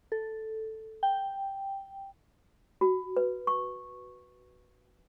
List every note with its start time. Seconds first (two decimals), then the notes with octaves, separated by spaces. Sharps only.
0.12 A4
1.03 G5
2.81 F#4
3.17 B4
3.47 C#6